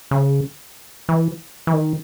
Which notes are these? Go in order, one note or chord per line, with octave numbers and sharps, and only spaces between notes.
C#3
E3
E3
D#3